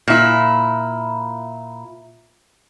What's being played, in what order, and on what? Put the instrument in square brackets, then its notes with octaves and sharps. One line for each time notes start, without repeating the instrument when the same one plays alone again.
[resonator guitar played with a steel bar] A#2 E4